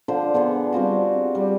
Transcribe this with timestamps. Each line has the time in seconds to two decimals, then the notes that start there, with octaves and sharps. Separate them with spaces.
0.08 D3 F3 C5
0.34 D3 B3 G#4 A4
0.73 G3 C4 F4 F#4
1.35 G3